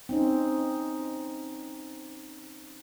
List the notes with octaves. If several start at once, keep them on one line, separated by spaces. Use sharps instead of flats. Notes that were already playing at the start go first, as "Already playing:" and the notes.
C4 C#4 D#4